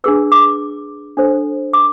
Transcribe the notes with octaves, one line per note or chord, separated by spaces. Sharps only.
D4 G#4 B4 E6
D6
D4 A4 C5
D6